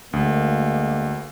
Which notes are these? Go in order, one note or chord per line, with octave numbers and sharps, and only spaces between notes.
D2 G#3 A#3